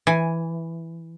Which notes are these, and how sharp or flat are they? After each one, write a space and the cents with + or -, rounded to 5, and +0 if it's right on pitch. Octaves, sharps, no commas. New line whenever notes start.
E3 +0 G#5 +0